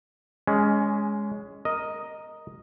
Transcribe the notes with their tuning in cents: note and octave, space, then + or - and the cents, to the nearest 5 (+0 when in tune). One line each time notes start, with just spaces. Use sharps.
G#3 +0 C#4 +15
A#4 +0 D#5 +0